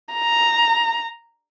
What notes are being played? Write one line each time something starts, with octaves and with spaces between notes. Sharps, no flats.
A#5